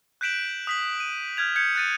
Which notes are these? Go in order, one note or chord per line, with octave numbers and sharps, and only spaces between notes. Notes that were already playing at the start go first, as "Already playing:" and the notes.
F#6 G6 B6 D7 E7 F#7
D#6 B6 F#7
D#7
F6 G6 G#6 F7
G6 G#6 C#7
F#6 A6 D#7